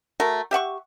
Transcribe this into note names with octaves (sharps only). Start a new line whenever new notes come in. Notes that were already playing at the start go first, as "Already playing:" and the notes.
A3 F#4 A#4
G4 E5 F#5 C#6